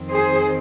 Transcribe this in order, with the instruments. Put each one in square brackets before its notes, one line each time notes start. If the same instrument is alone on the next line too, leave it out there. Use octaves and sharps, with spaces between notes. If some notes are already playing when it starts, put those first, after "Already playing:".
Already playing: [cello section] F2 D#3 C4
G#4 C5